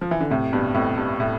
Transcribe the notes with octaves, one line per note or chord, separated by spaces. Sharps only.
F3
E3
D3
A2 C3
G2 B2
F2 A2
G2
A2